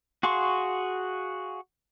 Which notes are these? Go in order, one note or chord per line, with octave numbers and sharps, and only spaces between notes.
F#4 G#4 F5 C6 C#6